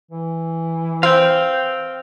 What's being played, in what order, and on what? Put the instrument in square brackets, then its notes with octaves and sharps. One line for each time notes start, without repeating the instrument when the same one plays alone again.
[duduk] E3
[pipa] C4 [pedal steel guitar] F5 G5